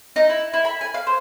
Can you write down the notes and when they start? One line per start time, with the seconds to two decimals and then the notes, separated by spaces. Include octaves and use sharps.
0.16 D#4
0.29 E4
0.53 E4
0.65 B5
0.81 G#5
0.94 F5
1.07 C5